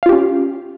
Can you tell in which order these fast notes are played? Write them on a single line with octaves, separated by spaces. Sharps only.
F5 F4 G4 C#4